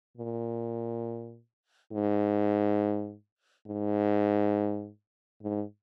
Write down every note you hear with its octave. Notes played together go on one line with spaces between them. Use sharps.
A#2
G#2
G#2
G#2